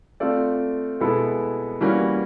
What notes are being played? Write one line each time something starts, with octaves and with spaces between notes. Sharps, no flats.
A3 C4 F4 A4 D5
B2 G#3 B3 E4 A4
E3 G3 A#3 C#4 F#4